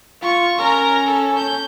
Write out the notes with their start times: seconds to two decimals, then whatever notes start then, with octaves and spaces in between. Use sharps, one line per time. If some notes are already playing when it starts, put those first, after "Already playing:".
0.22 F4 C#6
0.59 C#4 A#4 A#5
1.07 A4
1.37 G6